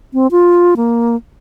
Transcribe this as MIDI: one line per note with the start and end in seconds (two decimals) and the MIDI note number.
0.13 0.27 60
0.31 0.75 65
0.77 1.16 58